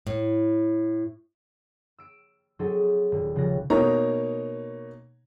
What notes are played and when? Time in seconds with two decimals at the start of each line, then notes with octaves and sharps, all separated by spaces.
0.07 A2
1.98 E6 D7
2.59 F#3 C4 D#4 G#4 A4
3.12 D#1
3.36 C#3 F3 G3 F#6 A#6
3.70 B2 A#3 D#4 C#5 A#5